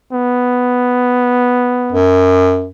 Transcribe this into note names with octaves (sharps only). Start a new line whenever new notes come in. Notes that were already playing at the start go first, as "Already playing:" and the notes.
B3
F#2